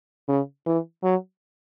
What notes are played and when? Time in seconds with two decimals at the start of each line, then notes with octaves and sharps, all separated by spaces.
0.28 C#3
0.66 E3
1.03 F#3